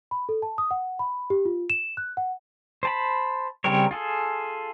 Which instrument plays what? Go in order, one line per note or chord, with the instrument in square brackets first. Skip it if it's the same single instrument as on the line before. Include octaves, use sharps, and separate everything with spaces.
[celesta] B5
A4
A5
D#6
F#5
B5
G4
F4
E7
F#6
F#5
[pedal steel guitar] C5 A5 B5
C#3 G3 C4 A#4 C#5
F4 G#4 A4